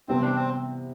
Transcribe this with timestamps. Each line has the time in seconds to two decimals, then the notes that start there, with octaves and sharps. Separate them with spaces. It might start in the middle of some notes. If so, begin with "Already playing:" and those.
0.08 C3 E3 G3 B3 C4 E4
0.22 D4
0.35 C4